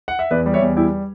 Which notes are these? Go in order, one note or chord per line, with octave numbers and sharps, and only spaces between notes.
F#5
E5
E2 B4 D5
G3
C#5 E5
E2
G3 E4 G4